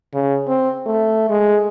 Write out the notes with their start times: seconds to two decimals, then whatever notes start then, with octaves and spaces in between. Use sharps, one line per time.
0.14 C#3
0.47 C4
0.86 A3
1.30 G#3